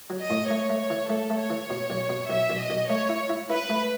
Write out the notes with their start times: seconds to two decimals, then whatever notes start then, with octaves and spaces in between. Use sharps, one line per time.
0.10 F#3
0.21 D#5
0.30 A2
0.50 A3 C#5
0.70 A3
0.80 C#5
0.90 E3
1.09 A3 A4
1.30 A3
1.39 C#5
1.50 E3
1.70 B2
1.90 B1
2.09 B2
2.30 B1 E5
2.50 B1
2.59 D#5
2.70 B1
2.90 A3 C#5
3.09 E4
3.29 E4
3.50 E4 B4
3.70 A3